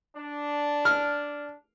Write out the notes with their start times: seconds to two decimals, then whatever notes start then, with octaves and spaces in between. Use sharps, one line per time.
0.16 D4
0.85 F6